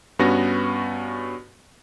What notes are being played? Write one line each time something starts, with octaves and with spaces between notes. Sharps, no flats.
G2 B3 C#4 F#4 A#6